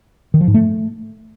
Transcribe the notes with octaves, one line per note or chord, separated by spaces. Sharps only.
D#3
F3
G#2
A3